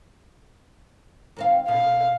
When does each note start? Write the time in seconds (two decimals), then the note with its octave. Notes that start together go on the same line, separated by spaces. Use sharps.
1.36 D#2 C4 F5
1.68 B2 F5